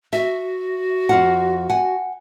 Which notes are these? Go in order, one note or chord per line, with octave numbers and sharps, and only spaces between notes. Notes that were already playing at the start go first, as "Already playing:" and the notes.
F#4 E5
F2 F4 F#5
F#5 G#5